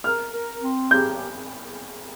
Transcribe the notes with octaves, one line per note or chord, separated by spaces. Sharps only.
A#4 F6
A#4
C4
G4 G6